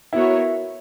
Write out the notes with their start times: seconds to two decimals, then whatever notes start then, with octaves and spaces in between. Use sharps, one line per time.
0.13 B3 E4 F#4 A#4 C#5